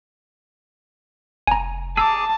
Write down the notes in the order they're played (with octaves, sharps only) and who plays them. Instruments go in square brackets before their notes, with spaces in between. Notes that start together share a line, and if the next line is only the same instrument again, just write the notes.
[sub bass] F1 [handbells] G#5 A#5
[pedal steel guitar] G#4 A#5 D6 [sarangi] A5 [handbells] E6